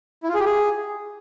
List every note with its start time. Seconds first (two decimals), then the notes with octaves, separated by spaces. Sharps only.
0.23 E4
0.29 F4
0.34 G#4
0.40 G4
0.45 G#4